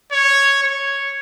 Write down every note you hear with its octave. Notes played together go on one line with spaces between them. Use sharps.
C#5
C#5